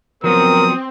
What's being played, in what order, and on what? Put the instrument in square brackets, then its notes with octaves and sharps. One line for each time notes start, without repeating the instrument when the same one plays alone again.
[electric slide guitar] F3 F#3 B3 [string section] C4 [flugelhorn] A#4 [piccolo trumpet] D#6